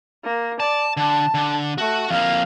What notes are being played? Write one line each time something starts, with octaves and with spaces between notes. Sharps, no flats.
A#3
D5 A5
D3 A5
D3
A3 F#4
F2 A#3 F5